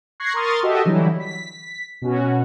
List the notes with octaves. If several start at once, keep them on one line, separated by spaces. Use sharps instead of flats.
C#6 F#6 G#6 A#6 C7
A#4 C6 C#6 D#6 F6 A6
F#4 G4 A4 D#5 E5
D3 E3 F#3 G3 E4
B6
B2 C#4 F#4